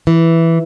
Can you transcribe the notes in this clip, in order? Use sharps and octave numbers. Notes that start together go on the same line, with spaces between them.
E3